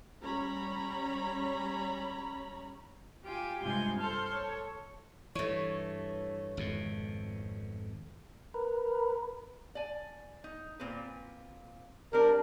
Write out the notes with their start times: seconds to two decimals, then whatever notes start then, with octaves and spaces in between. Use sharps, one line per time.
0.22 G3 C#4 C#5 A#5 B5
3.25 F4 G4 G5 G#5
3.63 G2 C3 G#3 F4 G#5 G6
4.00 A4 C5 A5 C6 F6 G6
4.33 A4 C#5
5.35 G2 E3 A3 C#5
6.57 G#1 F2 B2
8.54 A#4 B4
9.75 D5 G#5
10.44 D#4
10.80 A#2 C4 B4
12.13 G3 C4 D4 A#4